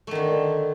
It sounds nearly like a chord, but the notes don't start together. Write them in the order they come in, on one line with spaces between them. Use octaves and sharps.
A3 D#3 D3